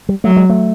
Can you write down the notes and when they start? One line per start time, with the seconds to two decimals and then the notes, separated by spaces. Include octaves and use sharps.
0.09 G3
0.24 F#3 A3
0.36 G#3
0.49 A3